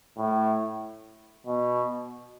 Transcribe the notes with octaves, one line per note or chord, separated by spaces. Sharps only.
A2
B2